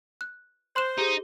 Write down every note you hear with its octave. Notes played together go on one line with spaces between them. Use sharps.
F#6
C5 C6 F#6 E7
D#4 G4 G#4